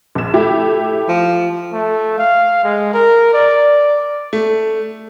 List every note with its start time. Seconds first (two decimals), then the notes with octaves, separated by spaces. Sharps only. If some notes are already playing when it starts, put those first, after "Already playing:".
0.15 A#1 E7
0.34 A3 E4 G4
1.09 F3
1.73 A3
2.18 F5
2.64 G#3
2.94 A#4
3.34 D5
4.33 A3